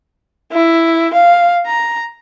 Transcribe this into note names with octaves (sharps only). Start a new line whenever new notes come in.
E4
F5
A#5